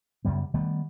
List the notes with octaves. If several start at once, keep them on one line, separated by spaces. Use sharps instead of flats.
F#2 C#3 G3 B3
D#3 G3 A3 B3